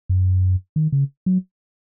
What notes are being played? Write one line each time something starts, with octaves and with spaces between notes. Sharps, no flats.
F#2
D#3
C#3
F#3